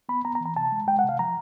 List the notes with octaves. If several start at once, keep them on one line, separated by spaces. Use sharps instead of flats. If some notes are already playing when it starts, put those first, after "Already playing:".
B3 B5
B3 A#5
A#5
E3
A#5
C3 A5
G#3
G#3 G5
F#5
C3
F5
F3 A#5